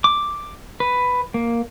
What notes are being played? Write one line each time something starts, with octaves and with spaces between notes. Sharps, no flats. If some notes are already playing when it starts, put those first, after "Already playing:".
D6
B4
A#3